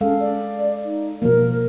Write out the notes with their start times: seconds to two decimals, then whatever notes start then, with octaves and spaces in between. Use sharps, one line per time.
0.01 G#3 C#4 A4 F5
0.20 D5
0.85 D#4
1.22 B2 F3 A#3 A#4